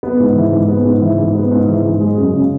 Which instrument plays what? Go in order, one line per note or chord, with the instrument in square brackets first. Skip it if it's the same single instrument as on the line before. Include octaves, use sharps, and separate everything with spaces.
[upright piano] B3
G#2
E3
G#2
B3
G#2
E3
G#2
B3
G#2
E3
G#2
G#3
F#2
C#3